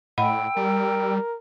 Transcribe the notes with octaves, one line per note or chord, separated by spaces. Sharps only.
A2 D#5 F#5 G5 B5 E6
G3 A#4